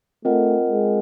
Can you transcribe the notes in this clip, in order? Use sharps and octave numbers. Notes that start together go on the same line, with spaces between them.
A3 C4 F4 A#4 D#5 F#5
G#3